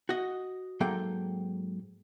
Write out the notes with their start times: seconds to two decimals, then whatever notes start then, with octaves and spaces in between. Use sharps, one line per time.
0.09 F#4 D#5
0.80 G#2 F#3 A#3 A4 G5